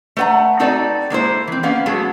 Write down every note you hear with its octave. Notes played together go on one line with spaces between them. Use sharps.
A3 B4 C5 F#5 A#5
C4 D#4 F#4 A4 B4 D5
G#3 A#3 E4 C5
E3 C4
A#3 B3 C#4 F5
F#3 G#3 A3 B3 F#4 G#4